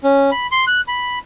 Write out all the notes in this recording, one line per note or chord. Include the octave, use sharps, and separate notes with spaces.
C#4
B5
C6
F#6
B5